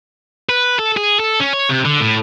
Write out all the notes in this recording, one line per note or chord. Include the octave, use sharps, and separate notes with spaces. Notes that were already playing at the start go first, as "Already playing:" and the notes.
B4
A4
G#4
A4
C#4
C#5
C3
D3
A2